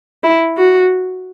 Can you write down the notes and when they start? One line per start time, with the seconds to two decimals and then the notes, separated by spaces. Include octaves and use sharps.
0.24 E4
0.58 F#4